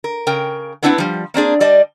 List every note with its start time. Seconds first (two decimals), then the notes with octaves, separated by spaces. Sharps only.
0.04 A#4
0.27 C#3 A#4 G5
0.83 B3 C4 D4 E4 B4 F#5
0.98 F3 G3
1.34 A#3 C4 D4 G#4
1.60 G3 D5 D#5 A5